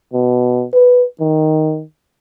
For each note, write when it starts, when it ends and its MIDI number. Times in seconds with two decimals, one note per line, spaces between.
0.13 0.65 47
0.73 1.05 71
1.20 1.83 51